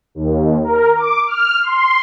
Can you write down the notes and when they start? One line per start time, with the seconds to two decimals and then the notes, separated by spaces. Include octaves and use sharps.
0.15 D#2
0.64 A#4
0.97 D6
1.27 F6
1.63 C6